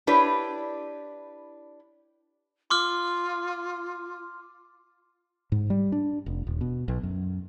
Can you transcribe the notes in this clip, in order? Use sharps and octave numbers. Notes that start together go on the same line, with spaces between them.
D4 E4 G4 B4 C#5 D5
F4 C6 D6 F6
G#2
G3
D4
F1
D#1
B2
B1
F#2